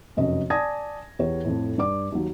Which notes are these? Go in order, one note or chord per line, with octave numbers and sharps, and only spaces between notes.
F1 F#2 D#5
D5 G#5 A5 D#6 G#6 A#6
E2 G4 C#5
F2 A2
G2 D5 D6
D#2 F#3